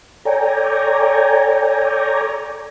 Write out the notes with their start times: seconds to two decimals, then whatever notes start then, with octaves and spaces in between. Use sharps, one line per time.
0.25 A4 C#5 D5 G5 G#5 A#5